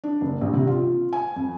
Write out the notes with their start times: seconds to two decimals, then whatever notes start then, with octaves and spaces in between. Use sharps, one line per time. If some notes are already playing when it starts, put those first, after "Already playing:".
0.04 D4
0.21 F#1
0.41 A#1
0.53 C3
0.67 F4
1.13 G#5
1.36 F2